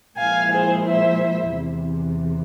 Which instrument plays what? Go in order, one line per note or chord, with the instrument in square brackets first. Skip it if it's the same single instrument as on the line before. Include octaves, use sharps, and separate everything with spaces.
[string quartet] A#2 F3 G#3 E4 F5 G#5
G#4 C5
C5 E5
E2 C3 E3